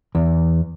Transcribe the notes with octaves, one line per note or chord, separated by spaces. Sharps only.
E2